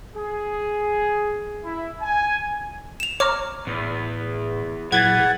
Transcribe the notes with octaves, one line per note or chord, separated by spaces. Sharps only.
G#4
E4
G#5
E7 F7
C#5 A#5 D6 F6
E2 A2
A#2 E3 F#3 G#4 F#5 G#6 A6